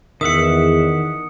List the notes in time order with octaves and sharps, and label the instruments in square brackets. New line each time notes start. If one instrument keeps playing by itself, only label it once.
[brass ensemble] E2 [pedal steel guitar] D#3 E5 F#5 [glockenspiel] D#6 C#7